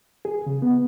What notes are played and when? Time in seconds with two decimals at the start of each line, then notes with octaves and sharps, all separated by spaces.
0.25 G#4
0.46 C#3
0.62 B3